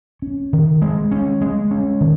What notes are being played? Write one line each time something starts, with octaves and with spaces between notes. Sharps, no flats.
C#4
D#3
G#3
C#4
G#3
C#4
D#3